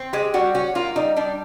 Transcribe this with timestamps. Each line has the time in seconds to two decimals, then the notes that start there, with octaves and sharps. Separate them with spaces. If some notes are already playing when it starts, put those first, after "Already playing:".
Already playing: C4
0.13 G#3 G4
0.34 G3 F#4
0.55 C#4 F#4
0.75 A#3 F4
0.96 G3 D#4
1.16 G3 D4